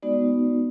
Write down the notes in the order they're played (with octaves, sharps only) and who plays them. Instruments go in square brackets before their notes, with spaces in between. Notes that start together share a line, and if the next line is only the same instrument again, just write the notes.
[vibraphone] G#3 B3 D#4 F#4 D5